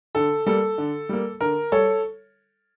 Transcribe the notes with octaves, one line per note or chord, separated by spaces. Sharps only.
D3 A4
G3 A#3 A4
D3
G3 A#3
D3 A#4
G3 A4 C#5